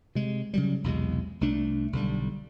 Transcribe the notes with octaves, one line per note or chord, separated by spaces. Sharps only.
C3 G#3
C#3 F#3 G3
B1 E2 C3 G#3
C2 A3 D4
B1 D3 D#3 G3